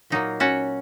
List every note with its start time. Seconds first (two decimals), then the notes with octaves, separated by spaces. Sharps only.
0.10 A#2 F#3 A#3 D#4
0.40 C#4 F#4